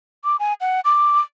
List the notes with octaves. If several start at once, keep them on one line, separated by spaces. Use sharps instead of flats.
D6
G#5
F#5
D6